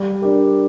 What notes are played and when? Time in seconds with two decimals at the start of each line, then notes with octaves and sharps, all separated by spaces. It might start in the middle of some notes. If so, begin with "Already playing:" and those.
Already playing: G3
0.22 D4 G4 A#4